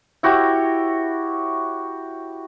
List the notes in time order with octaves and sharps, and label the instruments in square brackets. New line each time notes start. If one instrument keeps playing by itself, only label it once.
[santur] E4 F#4 G4 C#5